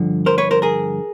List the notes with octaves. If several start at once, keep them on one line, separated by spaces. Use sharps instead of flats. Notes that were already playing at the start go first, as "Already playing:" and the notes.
Already playing: G2 D3 F3
A#4 C5
B4 C#5
A#4 C5
G#4 A#4